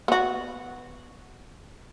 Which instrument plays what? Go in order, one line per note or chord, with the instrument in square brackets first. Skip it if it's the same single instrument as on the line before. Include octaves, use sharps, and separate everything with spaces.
[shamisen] B3 F#4